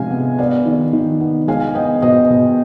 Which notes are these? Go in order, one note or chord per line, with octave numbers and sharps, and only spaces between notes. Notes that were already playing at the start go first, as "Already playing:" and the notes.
Already playing: C3 F3 G#3 F5 G#5
B3
B3 D5 F5
D#3
D#3
B3
G#3 F5 G#5
B3 D#5 G5
B2 C5 D#5
B2